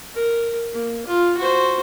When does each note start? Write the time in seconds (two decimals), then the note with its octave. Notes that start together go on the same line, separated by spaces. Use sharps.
0.14 A#4
0.73 A#3
1.07 F4
1.37 F#4 C5